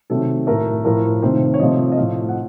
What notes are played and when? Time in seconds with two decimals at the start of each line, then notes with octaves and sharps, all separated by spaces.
0.10 C3 D#3 F#3 A3 A4
0.47 A2 A3 A#4
0.85 A2 F3 A3 A#4
1.22 C3 D#3 A3 C5
1.54 C#5
1.59 C3 F3 A3 D#5
1.92 D#5
1.97 A2 F3 A3 F5
2.29 F#5